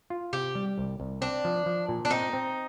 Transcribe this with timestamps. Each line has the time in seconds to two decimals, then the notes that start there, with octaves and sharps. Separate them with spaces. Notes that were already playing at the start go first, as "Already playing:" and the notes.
0.10 F4
0.33 C3 G4
0.55 G3
0.78 C2
1.00 C2
1.21 C4 D4
1.45 F3
1.66 F3
1.88 A#2
2.05 D4
2.11 C4 D#4
2.33 C4